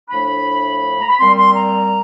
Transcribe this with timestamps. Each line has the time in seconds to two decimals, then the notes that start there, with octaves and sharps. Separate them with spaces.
0.09 A2 F3 A3 D4 B5
0.99 A#5
1.08 B5
1.19 A#2 G3 C4 C6
1.37 C6
1.55 A#5